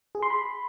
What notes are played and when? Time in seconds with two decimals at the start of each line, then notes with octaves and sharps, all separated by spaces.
0.15 G#4
0.22 C6
0.30 B5